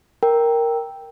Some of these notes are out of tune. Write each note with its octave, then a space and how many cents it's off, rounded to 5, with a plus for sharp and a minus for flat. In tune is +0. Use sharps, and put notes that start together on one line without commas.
A#4 +0 G5 +0